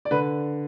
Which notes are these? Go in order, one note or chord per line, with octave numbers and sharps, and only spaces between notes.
D5
D3 B4